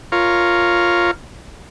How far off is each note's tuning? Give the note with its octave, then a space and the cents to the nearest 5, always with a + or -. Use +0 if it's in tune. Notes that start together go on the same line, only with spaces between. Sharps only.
F4 +0 A#4 +0 C#5 +0